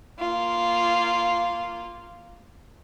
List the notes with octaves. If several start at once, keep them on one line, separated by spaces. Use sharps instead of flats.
A#3 F4